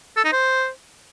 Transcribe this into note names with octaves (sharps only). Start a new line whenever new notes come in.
A4
D#4
C5